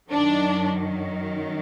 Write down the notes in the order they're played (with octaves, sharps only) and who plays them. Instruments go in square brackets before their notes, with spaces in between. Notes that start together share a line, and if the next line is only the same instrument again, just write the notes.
[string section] F#2 D#3 F#3 D4